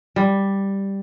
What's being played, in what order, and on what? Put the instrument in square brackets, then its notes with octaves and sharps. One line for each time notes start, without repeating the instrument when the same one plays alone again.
[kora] G3